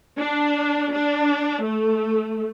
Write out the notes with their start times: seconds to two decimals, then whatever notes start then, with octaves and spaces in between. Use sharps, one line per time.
0.18 D4
0.92 D4
1.64 A3